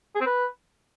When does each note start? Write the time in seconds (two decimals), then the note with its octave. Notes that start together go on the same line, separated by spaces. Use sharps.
0.15 G#4
0.21 C4
0.26 B4